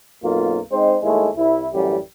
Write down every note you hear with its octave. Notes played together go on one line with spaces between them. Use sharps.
B1 F#2 A#3 F4
G#3 C4 D#4 C5
D#2 G#3 A3 E4
C2 E4
A1 F#2 E3 G3